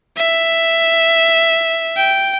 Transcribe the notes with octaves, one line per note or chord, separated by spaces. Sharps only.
E5
G5